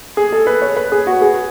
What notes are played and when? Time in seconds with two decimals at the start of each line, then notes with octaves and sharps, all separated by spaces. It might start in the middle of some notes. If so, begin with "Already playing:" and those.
0.17 G#4
0.32 A4
0.47 B4
0.62 C#5
0.76 B4
0.92 G#4
1.07 F#4
1.22 G#4